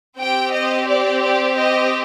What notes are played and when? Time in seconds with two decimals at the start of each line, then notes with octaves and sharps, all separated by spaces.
0.19 C4 G4 G5
0.53 D#5
0.87 D5
1.22 D5
1.56 D#5